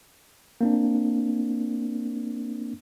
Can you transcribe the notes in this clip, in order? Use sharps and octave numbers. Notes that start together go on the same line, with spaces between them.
A#3 C4 D4